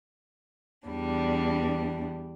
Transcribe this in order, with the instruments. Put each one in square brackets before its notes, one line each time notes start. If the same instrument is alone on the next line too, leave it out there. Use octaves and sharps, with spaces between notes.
[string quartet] E2 G3 D4